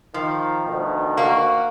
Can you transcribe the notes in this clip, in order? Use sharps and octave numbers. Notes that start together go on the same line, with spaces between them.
D#3 F3
D2 B2 D#3
A#3 F#4